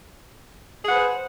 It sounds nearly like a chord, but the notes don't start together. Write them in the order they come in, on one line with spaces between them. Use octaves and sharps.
G#4 F#5 B4 C5